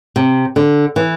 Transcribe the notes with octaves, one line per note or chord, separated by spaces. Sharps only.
C3
D3
E3